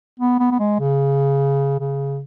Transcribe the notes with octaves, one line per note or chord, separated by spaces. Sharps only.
B3
B3
B3
G#3
C#3
C#3